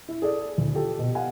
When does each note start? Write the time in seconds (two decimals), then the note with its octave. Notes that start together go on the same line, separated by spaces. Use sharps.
0.09 E4
0.22 G#4 A4 D5
0.58 D2
0.74 F4 G4 A4
0.99 B2
1.15 F5 F#5 G#5